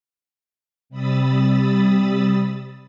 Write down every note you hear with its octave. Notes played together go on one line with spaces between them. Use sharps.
C3 G3 B5 D#6 E6 A6